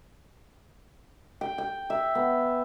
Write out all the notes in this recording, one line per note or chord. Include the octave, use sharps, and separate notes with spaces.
G5
G5
E5
B3